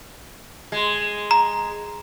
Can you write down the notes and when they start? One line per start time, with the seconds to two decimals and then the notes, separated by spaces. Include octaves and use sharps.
0.72 G#3
1.31 A#5